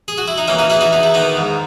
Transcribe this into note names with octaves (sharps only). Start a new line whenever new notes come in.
G#4
F#4
E4
D#4
E3 A#3 C#4
D#4 F#4
E3 E4 G#4
D#4 F#4
E2 D#4
E4
D#3 B3 D#4
G#2